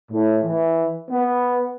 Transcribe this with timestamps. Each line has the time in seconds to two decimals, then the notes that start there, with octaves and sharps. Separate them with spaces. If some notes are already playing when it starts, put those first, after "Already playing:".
0.12 A2
0.45 E3
1.10 B3